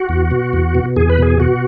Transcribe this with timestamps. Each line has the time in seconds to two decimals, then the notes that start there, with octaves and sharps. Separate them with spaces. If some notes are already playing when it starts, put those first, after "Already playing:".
Already playing: F#4
0.09 E2
0.31 B2
0.53 E2
0.75 B2
0.96 E2 G#4
1.09 B4
1.18 B2 G#4
1.40 B2 F#4